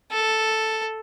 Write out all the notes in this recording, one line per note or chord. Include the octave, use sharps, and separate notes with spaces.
A4